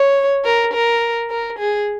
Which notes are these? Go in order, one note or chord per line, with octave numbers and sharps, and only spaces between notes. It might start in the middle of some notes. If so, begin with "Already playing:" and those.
Already playing: C#5
A#4
A#4
A#4
G#4